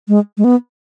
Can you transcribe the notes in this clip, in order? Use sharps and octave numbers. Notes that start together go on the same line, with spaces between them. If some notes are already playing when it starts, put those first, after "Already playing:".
G#3
G#3
B3